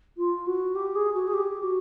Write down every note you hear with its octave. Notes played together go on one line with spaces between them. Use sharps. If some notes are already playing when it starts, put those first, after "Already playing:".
F4
F#4
G4
G#4
F#4
G#4
G4
F#4